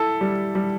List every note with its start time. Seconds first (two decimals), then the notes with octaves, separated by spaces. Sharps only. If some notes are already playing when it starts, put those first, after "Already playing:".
Already playing: E4 A4
0.21 G3
0.55 G3